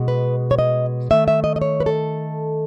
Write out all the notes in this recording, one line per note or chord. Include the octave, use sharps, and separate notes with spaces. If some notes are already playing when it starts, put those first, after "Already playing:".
Already playing: B2 G#3
B4
C#5
D#5
D#3 A3 E5
E5
D#5
D#5
C#5
B4
A4